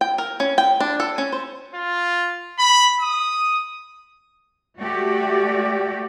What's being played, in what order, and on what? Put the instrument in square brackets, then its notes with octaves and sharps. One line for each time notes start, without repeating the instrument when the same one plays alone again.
[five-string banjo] G5
A#4
C#4
G5
D4
A4
C#4
C5
[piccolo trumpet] F4
B5
D#6
[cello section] A3 F#4 G4 D5